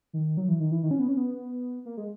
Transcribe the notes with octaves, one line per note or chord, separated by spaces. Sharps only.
D#3
F#3
E3
D#3
E3
D#3
C#4
B3
C#4
B3
A#3
G#3